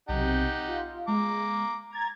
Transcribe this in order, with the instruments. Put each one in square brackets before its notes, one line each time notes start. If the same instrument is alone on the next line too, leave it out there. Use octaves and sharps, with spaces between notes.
[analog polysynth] B1 C3 [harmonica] D#4 G4 F#5
[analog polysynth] F4
[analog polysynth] G#3 [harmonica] A#5 D6
[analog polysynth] A#5 G#6 A6